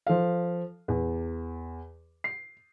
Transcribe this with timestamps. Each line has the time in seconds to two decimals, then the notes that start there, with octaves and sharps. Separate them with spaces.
0.07 F3 A4 F5
0.88 E2
2.24 C7